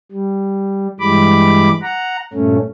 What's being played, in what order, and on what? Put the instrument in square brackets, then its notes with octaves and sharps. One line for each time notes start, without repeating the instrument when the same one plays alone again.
[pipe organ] G3
G2 E3 G3 G#3 B5 D6
F#5 A#5
G2 A#2 A3 C#4